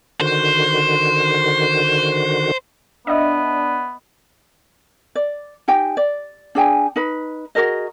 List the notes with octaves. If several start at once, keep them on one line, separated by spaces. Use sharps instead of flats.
D3 D#3 F#4 C5
B3 D4 D#5 E5
D5
D#4 G4 G5 G#5
D5
D4 G#4 G5 G#5
D#4 B4
F#4 G#4 A#4 D#5